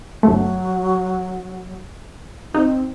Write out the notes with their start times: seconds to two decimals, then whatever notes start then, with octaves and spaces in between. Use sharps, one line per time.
0.23 G1 F#3 A3
2.54 C4 D#4